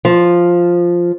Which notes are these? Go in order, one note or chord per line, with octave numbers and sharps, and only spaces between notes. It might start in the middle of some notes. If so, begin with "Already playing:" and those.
F3